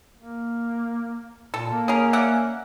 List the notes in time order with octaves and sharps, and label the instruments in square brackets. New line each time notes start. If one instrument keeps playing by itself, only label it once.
[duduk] A#3
[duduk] A#2 [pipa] A4
[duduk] A#3
[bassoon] C#4 [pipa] G#4 A#4
[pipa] D5 E5 F#5